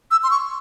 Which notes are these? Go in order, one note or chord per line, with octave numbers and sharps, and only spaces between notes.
E6
C6
C#6